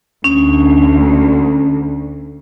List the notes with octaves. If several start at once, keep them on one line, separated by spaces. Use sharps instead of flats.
D2 C#4